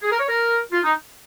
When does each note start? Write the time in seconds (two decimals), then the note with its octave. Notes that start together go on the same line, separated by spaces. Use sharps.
0.03 G#4
0.11 A#4
0.20 C#5
0.29 A#4
0.72 F4
0.84 D#4